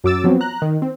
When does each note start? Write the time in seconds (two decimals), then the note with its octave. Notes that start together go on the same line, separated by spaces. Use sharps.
0.04 F#2 F#3 D6 E6 A6
0.24 F3 F#3 B3 C4
0.41 A#5 F#6
0.62 D#3
0.82 C4